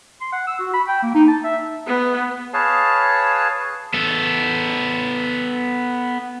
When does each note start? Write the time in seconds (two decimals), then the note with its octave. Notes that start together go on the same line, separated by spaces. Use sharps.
0.21 C6
0.32 F#5
0.47 E6
0.59 F#4
0.73 B5
0.88 G5
1.02 A#3
1.15 D#4
1.28 A5
1.44 E5
1.87 B3
2.54 G#4 B4 C#5 F5 A5
3.94 B3 A4